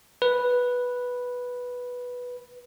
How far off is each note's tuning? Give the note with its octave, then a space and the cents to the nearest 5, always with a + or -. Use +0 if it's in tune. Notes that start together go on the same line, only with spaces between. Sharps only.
B4 -5